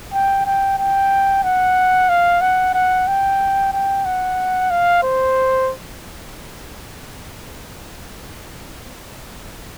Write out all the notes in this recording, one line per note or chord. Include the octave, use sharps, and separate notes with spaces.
G5
G5
G5
F#5
F5
F#5
F#5
G5
G5
F#5
F5
C5